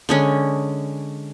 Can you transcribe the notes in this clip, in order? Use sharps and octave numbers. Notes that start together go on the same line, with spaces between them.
D3 G#3 C#4